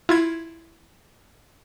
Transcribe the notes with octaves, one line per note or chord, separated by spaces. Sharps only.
E4 F4 G#6